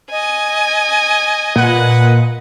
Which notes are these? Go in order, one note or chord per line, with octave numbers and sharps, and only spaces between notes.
D#5 G#5
A#2 B4 F#5